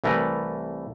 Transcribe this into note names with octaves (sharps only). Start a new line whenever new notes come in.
C2 E3 A3 A#4 B4